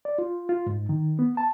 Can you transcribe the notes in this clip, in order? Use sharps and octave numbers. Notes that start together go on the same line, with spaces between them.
D5
F4
F4
G#2
D#3
B3
A5